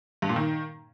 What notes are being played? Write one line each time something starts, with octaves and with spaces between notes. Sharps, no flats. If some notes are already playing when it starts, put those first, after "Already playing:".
G2
A#2
D#3